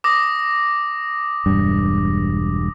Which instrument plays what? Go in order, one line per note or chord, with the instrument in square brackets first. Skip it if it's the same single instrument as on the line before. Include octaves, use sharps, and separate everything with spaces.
[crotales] D6 D#6 A#6
[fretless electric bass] E1 G2